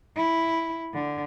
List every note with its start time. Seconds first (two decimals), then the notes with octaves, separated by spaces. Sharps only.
0.17 E4
0.94 D3